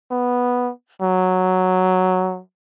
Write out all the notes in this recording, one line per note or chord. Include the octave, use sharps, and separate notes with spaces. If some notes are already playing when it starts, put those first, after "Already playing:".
B3
F#3